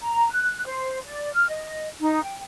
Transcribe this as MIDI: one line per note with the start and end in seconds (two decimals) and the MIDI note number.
0.02 0.29 82
0.31 0.64 90
0.66 0.99 72
1.05 1.32 74
1.34 1.48 89
1.49 1.89 75
2.00 2.22 63
2.22 2.40 79